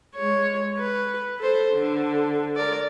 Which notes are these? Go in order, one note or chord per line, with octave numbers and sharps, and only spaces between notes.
G#3 C#5
B4
A4 C5
D3
A#4 D5